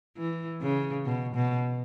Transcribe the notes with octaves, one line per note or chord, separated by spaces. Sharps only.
E3
C#3
B2
B2